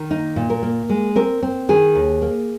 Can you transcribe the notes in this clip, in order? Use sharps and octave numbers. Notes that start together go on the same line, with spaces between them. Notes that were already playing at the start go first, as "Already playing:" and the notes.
Already playing: D#3
A#3 D#4
A#2
A#4
A#3
G#3
C4 A#4
C4
D#3 G#4
D#2
A#3